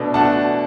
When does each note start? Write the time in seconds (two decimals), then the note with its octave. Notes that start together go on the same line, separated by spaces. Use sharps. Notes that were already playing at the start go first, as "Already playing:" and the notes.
Already playing: B2 A3 D4
0.14 B2 A3 D4 F#5 A5